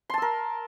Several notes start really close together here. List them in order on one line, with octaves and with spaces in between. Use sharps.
C6 A5 E6 A#4